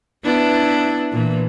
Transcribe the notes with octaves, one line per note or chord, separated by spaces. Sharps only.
B3 D4 E4
A#2 E3